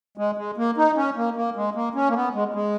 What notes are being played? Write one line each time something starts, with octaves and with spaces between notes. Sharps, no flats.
G#3
G#3
A#3
D#4
C#4
A#3
A#3
G#3
A#3
C#4
A#3
B3
G#3
G#3